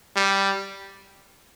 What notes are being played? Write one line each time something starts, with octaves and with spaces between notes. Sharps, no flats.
G3